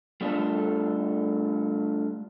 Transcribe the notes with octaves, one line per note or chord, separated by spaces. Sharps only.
G3 A3 D4 F4 A4